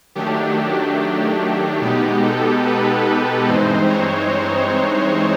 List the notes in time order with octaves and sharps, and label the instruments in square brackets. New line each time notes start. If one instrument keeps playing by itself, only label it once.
[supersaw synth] D#3 F#3 A3 D4 G4
B2 G#3 B3 D#4 G4
A4
B4
G2 E3 G#3 C4 D#4 C5
C#5